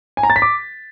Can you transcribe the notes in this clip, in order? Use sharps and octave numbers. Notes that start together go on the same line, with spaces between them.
G#5
A#5
A6
B6
D6